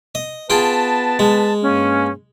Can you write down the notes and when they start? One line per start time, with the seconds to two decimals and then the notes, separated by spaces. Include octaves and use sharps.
0.15 D#5
0.50 B3 F4 G#4 B4 G5 A5
1.19 G#3
1.62 G2 A#3 C#4